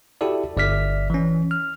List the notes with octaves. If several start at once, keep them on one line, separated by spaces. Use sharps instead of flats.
E4 F#4 G4 A4 D5
G1 D5 E5 F6 B6
E3 C#4
F6